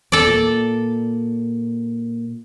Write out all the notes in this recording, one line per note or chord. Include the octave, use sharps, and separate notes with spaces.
E2 A4 D5
A#2